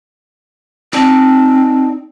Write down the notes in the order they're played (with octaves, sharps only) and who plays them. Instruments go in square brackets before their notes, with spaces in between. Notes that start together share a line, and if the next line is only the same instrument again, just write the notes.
[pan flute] C4 [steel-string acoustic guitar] D#4 D5 A5